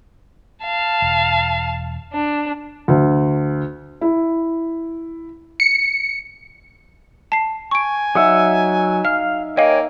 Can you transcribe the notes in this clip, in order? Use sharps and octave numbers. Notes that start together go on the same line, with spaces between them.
F5 A5
E1
D4
D2
E4
C#7
A5 C7
G#5 C#6 D7
F#3 D#4 E5 F#5 D#6
F5 F6
A#3 C#5 D#5 F5 G5 G#5